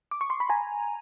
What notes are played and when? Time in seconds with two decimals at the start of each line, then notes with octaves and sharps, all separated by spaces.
0.11 D6
0.21 C#6
0.30 C6
0.40 B5
0.49 G#5 A#5